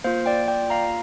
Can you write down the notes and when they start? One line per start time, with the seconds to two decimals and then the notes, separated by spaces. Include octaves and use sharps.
0.04 A#3 F4 C5 F5
0.26 D5 G5
0.48 D5 G5
0.70 F5 A#5